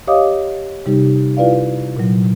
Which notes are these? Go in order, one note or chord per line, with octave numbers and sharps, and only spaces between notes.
G4 C#5 D#5 F5 D6 D#6
C3 G3 D#4 G4
E4 F4 B4 D5 F5
A#2 F#3